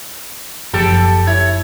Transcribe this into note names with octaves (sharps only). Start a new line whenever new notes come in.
F#1 F3 G4 A4 G5 A5
E4 C#5